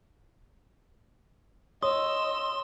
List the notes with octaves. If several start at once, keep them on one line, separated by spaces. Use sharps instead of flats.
C#5 D#5 C6 D#6 E6